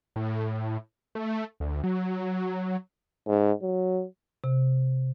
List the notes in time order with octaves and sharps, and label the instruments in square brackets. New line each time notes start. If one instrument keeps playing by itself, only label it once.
[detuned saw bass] A2
A3
D2
F#3
[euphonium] G#2
F#3
[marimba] C3